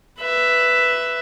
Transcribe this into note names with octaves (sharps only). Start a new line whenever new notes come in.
B4 E5